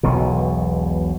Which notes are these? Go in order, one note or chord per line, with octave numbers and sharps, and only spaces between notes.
E1 B1 B2